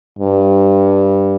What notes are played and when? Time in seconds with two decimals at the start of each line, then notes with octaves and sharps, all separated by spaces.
0.19 G2